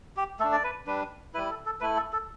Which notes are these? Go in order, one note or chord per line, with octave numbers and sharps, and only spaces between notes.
G4
A3 D4 A4
D5
B4
G3 D4 B4
G3 E4 B4
A4
A4
A3 E4 B4
A4
A4